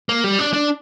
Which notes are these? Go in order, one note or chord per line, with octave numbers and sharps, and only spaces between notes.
A#3
G3
D4
D4